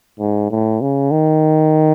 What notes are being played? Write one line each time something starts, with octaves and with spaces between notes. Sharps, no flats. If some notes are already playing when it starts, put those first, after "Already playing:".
G#2
A2
C#3
D#3